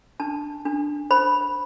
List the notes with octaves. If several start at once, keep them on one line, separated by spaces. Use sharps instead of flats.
D4 A5
D4
C5 B5